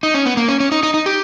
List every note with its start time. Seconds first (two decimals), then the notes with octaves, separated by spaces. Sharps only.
0.03 D#4
0.14 C#4
0.26 B3
0.37 A#3
0.48 C#4
0.60 C#4
0.72 D#4
0.83 D#4
0.94 D#4
1.06 G4